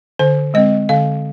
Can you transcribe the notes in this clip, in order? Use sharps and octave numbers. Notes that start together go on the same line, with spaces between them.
D3 C5
G#3 C4 D#5
D3 F5